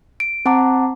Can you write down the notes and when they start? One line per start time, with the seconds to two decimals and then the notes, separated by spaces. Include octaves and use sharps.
0.20 D7
0.45 C4 F#5 A5 A#5 D6